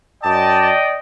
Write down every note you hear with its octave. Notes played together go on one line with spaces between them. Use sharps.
F#2 D5 D#5 G5 A5